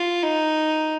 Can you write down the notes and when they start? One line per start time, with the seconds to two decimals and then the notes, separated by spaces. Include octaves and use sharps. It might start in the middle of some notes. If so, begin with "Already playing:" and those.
Already playing: F4
0.23 D#4